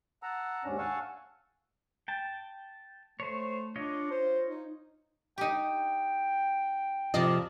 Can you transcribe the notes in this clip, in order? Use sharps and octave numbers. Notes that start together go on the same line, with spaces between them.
F#5 A5 A#5 E6
D#2 G#2 C#4 D4
F5 F#5 G#5 A5 C#6 E6
G5 A5
A3 C5 C#5
D4 F4 C#5 D#5
C5
D#4
D#4 G4 G5
F2 C3 F3 D5 D#5